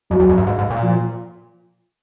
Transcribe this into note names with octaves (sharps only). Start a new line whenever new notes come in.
F2 F#3
E2
F2
G2
G#2
G#2
A#2
F3